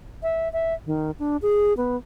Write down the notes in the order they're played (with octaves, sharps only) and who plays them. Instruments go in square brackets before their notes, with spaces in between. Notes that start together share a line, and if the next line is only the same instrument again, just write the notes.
[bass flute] E5
E5
D#3
D4
G#4
B3